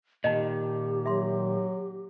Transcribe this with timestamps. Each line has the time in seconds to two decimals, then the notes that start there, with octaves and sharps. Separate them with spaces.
0.24 A#2 D#3 D#4 G4 D#5
1.06 F#3 E5 C6